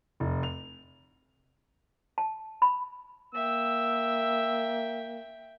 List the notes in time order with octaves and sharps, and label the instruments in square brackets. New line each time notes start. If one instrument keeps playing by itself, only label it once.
[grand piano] F1
F7
[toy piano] A5
B5
[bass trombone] A#3 [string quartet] E5 G5 [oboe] E6